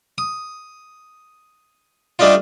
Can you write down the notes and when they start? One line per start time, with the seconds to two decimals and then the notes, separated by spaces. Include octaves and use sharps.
0.18 D#6
2.19 G3 A3 D4 D#4 F4